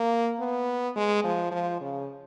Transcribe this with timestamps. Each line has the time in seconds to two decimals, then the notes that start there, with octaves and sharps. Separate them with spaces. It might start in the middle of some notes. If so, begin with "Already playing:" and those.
Already playing: A#3
0.39 B3
0.96 G#3
1.24 F3
1.51 F3
1.80 C#3